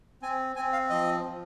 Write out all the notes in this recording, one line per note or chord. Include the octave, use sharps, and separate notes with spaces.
C4 G#5
C4 G#5
F5
F3 D#5
F3